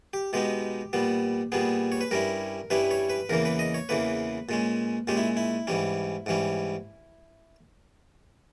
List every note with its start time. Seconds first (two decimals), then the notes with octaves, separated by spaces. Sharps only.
0.13 G4
0.33 B2 G#3 B3 D#4 G4
0.93 A#2 G3 B3
1.52 A#2 G3 B3 G#4
1.92 C#5
2.01 B4
2.11 G2 G3 C#4 E4 A#4
2.70 G2 G3 C#4 E4 B4
2.91 C#5
3.10 B4
3.29 E2 C#3 E3 A#3 A#4
3.45 B4
3.59 D#5
3.74 C#5
3.89 E2 C#3 E3 A#3 B4
4.49 A#2 G#3 C#4
5.08 A#2 G#3 C#4 G4
5.17 E4
5.37 E4
5.67 G#2 E3 G3 C#4
6.26 G#2 E3 G3 C#4